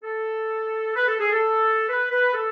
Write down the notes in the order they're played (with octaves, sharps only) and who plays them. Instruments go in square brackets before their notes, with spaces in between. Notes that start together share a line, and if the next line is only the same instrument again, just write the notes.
[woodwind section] A4
B4
A4
G#4
A4
B4
B4
A4